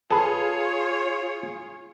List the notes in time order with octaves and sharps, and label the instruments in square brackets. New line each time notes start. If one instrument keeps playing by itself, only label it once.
[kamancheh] F4 C#5 [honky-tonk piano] G#4 [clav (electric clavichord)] A4 B4